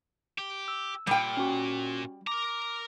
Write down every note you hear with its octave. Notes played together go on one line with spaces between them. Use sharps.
G4
E6
A#2 G3 G5
C#4 F#4
A#4 A#5 D6